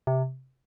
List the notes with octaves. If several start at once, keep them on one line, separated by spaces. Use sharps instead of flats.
C3